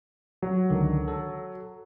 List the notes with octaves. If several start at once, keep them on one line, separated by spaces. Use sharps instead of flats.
F#3
C#2 D3 D#3
A4